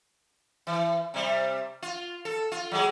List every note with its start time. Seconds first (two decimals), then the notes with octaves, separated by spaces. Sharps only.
0.67 E3
1.14 C3 G3
1.82 F4
2.25 A4
2.52 F4
2.71 F#3 G#3 G#4